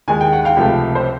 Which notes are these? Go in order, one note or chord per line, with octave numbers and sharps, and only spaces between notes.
D#2 D#3 G#3 G#5
G5
F#5
F5 G5
C#2 C3 F3 A3
C5